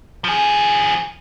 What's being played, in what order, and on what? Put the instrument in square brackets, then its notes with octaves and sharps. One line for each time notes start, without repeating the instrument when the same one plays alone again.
[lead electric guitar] F3 G#4